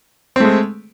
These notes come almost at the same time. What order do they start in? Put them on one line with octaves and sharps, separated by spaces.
C4 A3 G#3